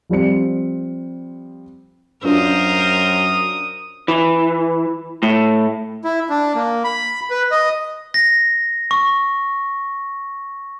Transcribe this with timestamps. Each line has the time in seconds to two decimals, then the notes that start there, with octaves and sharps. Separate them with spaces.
0.09 F3 G3 C4 C#7
2.24 F#2 D4 F4 A#4 C5 D#6
4.08 E3
5.23 A2
6.05 E4
6.30 D4
6.55 A#3
6.84 B5
7.31 B4
7.51 D#5
8.14 A#6
8.91 C#6